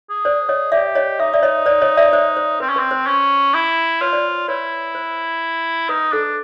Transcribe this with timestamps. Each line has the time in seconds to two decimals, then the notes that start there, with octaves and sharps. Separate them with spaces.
0.10 G#4
0.25 C5 D5
0.49 C#5 D#5
0.72 G4 D5 E5
0.95 C#5 D#5
1.20 D#4 E5
1.34 D5 E5
1.43 C#5 D#5
1.66 C5 D5
1.82 C#5 D#5
1.97 D5 E5
2.13 C5 D5
2.37 C5
2.60 C4 B4
2.69 C#4
2.76 C4 B4
2.91 C5
3.07 C#4
3.54 E4
4.01 F4 B4 C#5
4.13 C5 D5
4.48 E4 B4 C#5
4.95 C5
5.89 D#4 B4
6.13 D4 A4